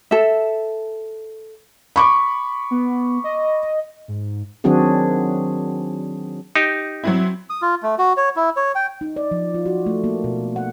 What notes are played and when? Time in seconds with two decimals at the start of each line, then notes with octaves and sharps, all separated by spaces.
0.11 A4 E5
1.96 B5 C#6 D6
2.71 B3
3.24 D#5
4.08 G#2
4.64 D#3 F#3 C4 D4 F#4 G#4
6.56 D#4 G4
7.04 F#3 C4 E4
7.50 D#6
7.62 F4
7.83 A3
7.98 F#4
8.17 C#5
8.36 E4
8.57 C#5
8.75 G5
9.01 D#4
9.16 D5
9.31 F3
9.54 F4
9.66 F#4
9.86 A3
10.04 A#3
10.24 B2
10.56 F#5